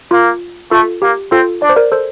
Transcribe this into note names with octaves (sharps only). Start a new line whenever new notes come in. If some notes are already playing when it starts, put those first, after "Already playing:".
A#3 F4
A3 F4 A4
A#3 G4
C4 F4 A4
D4 D5
C5
A#4 D5
A4 C5